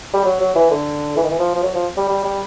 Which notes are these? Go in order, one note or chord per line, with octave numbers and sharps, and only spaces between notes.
G3
F#3
F#3
E3
D3
E3
D#3
E3
F3
F3
F#3
F3
G3
G3
G3